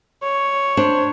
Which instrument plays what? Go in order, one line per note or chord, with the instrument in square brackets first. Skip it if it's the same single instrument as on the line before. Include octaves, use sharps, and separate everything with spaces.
[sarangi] C#5
[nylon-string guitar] D4 [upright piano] C5